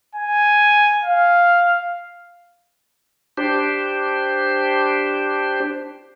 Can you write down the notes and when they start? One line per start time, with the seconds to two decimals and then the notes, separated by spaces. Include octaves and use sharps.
0.15 G#5
1.04 F5
3.37 D4 G4 C5